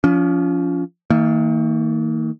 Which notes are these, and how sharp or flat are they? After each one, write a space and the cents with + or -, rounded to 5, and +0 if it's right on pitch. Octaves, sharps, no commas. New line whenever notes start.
F3 +0 C#4 +35
D#3 +35 A#3 -30